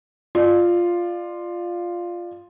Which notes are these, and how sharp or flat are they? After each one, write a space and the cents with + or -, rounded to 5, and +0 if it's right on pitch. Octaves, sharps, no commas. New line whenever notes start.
F4 +0 D5 +30